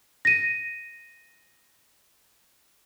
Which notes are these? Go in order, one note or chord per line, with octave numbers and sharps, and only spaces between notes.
A#6 D#7